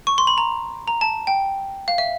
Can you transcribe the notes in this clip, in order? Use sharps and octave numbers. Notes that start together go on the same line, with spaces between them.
C#6
C6
B5
A#5
A#5
A5
G5
F5
E5